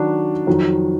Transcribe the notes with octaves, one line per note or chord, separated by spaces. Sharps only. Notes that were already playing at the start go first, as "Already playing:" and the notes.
Already playing: D#3 F#3 D4 F#4
F2 D#3 F#3